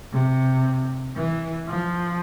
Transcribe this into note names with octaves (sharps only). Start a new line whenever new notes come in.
C3
E3
F3